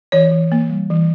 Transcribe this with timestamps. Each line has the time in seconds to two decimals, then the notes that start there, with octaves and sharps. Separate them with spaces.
0.12 E3 C#5
0.31 E3
0.52 A#3
0.70 G3
0.90 E3